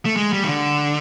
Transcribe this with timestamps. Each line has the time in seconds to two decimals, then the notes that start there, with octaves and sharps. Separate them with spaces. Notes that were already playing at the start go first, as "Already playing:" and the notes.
0.05 A3
0.17 G#3
0.33 G3
0.44 D#3
0.48 D3